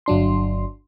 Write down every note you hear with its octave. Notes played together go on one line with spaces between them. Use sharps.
G1 F#3 D4 C6